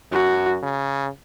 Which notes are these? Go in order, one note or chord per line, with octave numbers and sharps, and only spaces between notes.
F#2 F#4
C#3